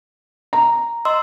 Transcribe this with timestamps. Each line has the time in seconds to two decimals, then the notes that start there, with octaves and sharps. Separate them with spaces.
0.53 A#5
1.05 D#5 C6 E6